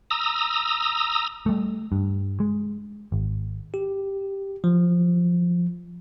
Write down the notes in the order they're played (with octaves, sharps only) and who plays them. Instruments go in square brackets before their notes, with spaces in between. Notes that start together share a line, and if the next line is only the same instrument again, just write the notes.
[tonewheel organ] A#5 D#6 E6
[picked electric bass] G3 A3
G2
G#3
G#1
[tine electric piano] G4
F3